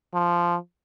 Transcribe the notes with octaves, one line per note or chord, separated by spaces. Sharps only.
F3